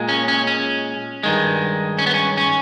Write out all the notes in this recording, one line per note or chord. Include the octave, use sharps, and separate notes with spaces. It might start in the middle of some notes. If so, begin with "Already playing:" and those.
Already playing: A#2 G#3
C#4
C#4
C#4
G2 D#3 G#3
C#4
B3
C#4
C#4